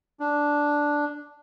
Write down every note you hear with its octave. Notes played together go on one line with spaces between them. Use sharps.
D4